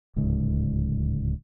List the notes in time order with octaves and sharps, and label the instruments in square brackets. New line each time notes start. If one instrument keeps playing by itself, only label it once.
[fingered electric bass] D1 C#2 G#2